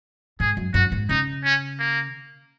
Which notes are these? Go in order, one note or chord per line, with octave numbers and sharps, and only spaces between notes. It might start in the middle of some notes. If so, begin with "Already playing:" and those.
G#2 G#4
F#2
F#2 F#4
G#2
C#3 D#4
C#4
A#3